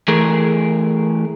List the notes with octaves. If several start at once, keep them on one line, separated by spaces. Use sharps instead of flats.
E3 A3 G#4 A#4